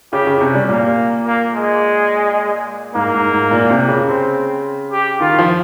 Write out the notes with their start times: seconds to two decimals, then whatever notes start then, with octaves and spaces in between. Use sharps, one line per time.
0.13 C#3 G4
0.27 C#3
0.41 C3 C#4
0.54 G3
0.69 A#2 A#3
1.26 A#3
1.54 G#3
2.94 G#2 A#3
3.14 G#2
3.33 G#2
3.51 A#2
3.70 C3
3.88 C#3
4.08 C4
4.92 G4
5.20 D#3 F4
5.39 F3